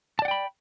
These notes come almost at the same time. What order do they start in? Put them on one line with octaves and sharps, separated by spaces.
A5 D5 F#5 G5 B5